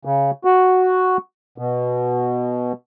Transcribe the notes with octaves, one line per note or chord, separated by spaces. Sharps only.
C#3
F#4
B2